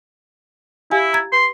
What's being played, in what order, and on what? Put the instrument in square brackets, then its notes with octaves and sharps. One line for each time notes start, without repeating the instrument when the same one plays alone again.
[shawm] E4 [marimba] G4 F5 G#5
[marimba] A#5 G#6 A6
[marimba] B4 [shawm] C6